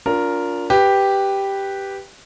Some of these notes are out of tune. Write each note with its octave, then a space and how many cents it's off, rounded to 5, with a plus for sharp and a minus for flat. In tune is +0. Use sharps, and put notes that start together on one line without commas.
D4 -40 F4 +15 A#4 +0
G4 +0 B4 +0